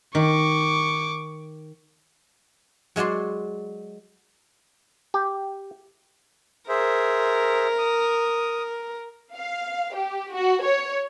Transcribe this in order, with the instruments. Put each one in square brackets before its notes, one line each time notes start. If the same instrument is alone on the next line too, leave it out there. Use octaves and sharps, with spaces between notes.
[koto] D#3 [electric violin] C#6 D6
[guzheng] F#3 G#3 F#4 D5 C6
[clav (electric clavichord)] G4
[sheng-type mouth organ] G#4 C5 E5 [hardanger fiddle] A#4
[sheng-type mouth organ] D#6
[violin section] F5
G4
F#4
C#5